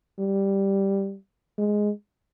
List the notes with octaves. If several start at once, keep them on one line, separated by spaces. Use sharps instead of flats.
G3
G#3